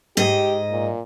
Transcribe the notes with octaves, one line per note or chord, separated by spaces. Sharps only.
G#2 G4 D#5
A#2